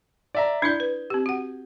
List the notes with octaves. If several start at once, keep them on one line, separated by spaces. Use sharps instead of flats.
D5 E5 A#5
D4 E4 D5 G6 G#6
B4
C4 G4
F#4 F#5